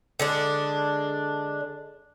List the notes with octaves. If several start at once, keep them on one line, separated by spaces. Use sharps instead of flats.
D3 G#3 D4